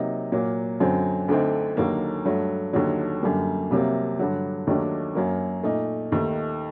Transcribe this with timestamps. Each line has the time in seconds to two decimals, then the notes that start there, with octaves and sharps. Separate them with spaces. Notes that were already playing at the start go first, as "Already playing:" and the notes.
Already playing: C3 F#3 A#3 D#4
0.32 A#2 F#3 A#3
0.80 F#2 D3 F#3 C4
1.28 D2 D3 A3 C4 D#4
1.77 D#2 D3 F#3 A#3
2.25 G2 F#3 A3
2.73 D#2 D3 F#3
3.22 F#2 D3 G3 A#3
3.71 C2 C3 F#3 A#3
4.19 G2 D3 F#3
4.67 D#2 D#3 F#3 A3 D4
5.15 F#2 F#3 A#3
5.63 A#2 A3 D#4
6.12 D#2 D#3 A3